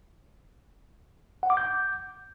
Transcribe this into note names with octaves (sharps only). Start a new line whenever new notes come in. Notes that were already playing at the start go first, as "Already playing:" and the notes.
F#5
D6
G6